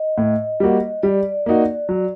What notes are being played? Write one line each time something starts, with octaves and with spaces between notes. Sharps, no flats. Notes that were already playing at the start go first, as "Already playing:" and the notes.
Already playing: D#5
A2
G3 A#3 F#4
G3 D5
A#3 D#4 F#4
F#3